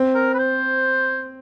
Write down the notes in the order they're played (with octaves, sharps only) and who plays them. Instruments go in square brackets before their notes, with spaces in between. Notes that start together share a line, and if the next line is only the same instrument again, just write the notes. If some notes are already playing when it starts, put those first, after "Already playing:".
Already playing: [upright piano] C4
[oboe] A#4
B4
C5